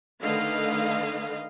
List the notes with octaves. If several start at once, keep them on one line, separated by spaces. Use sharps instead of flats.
D3 D#3 A3 B4 D#5 F5